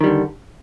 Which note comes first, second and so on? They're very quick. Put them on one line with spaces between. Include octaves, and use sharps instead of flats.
D#3 G3 D3